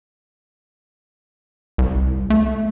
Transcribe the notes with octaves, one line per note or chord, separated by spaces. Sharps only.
C2
A3